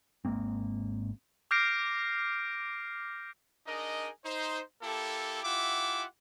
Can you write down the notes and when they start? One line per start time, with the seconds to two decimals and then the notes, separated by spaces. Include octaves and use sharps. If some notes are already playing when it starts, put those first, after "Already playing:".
0.25 G#1 G#3 A#3 C4
1.51 D6 F6 G6 A#6 C7 D7
3.67 D4 D#4 G#4 A#4 D#5
4.25 D#4 C5
4.82 A#3 E4 G4 A4
5.44 E4 F4 G4 E5 F#5 D6